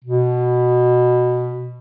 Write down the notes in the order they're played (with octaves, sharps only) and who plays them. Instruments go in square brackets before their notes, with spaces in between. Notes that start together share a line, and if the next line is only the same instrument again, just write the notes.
[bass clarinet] B2